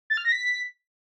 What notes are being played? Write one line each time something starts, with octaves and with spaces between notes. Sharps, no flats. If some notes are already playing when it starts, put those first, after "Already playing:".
A6
F6
A#6
B6